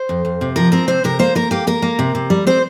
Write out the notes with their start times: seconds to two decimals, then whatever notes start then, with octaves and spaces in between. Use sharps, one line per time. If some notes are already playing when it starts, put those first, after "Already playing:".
Already playing: C5
0.09 F2
0.25 F2
0.41 C3
0.56 F3 A#4
0.72 C4 A#4
0.88 C3 C5
1.04 C3 A#4
1.19 A#3 C5
1.35 A#3 A#4
1.51 A#3 G4
1.67 A#3 A#4
1.82 A#3
1.99 C3
2.15 C3
2.30 G3
2.47 C4 C5